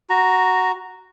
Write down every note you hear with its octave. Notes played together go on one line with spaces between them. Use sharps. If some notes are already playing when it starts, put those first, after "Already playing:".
F#4 A#5